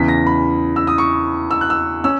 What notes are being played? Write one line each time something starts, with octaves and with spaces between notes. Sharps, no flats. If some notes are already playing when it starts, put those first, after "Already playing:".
Already playing: E2 C#3 E3 B6
A#6
B5
E6
D#6
C#6
E6
F#6
E6
C#4 E6